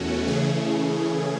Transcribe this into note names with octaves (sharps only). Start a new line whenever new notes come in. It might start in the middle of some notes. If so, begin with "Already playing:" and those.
Already playing: E2 B2 A3 C#4 F#4
C#3 E3 A3 C#4 G#4